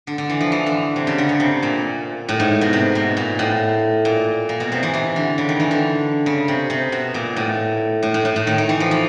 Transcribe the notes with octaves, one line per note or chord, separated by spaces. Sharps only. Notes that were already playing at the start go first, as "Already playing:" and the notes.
D3
D3
E3
F3
E3
D3
C3
C#3
D3
C#3
C3
A#2
A2
G#2
B2
C3
B2
A#2
A2
A#2
A#2
B2
C3
E3
E3
D3
C#3
D#3
E3
D3
C#3
C3
C3
B2
A#2
A2
A2
A2
A2
A2
D#3
D#3
E3
F3
F3